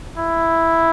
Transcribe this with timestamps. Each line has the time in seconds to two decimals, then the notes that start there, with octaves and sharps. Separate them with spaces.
0.18 E4